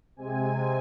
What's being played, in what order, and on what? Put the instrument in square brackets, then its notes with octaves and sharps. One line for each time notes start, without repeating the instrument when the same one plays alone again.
[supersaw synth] C3 G#3 C4 G#5